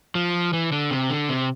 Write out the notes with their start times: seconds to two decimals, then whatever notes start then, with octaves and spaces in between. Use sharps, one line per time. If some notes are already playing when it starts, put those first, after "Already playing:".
0.15 F3
0.53 E3
0.72 D3
0.91 C3
1.10 D3
1.29 C3